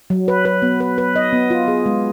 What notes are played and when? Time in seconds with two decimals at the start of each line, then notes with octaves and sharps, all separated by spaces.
0.10 F#3
0.28 B4
0.45 B4
0.62 B3
0.80 B4
0.98 B4
1.16 D#5
1.33 B3
1.50 F4
1.68 G#4
1.86 G#3